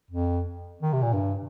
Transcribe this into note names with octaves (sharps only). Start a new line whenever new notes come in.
F2
D#3
C3
A#2
G2